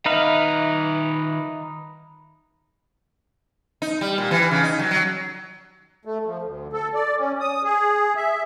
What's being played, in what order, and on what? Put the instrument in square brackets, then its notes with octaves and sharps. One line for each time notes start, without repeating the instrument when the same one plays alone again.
[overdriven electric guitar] D#3 E5 [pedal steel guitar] D#4 B4 F5
[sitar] D#4
G3
A#2
E3
C#3
D#4
F#3
F#3
[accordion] A3
F3
D2
A4
D5
C#4
D#6
G#4
E5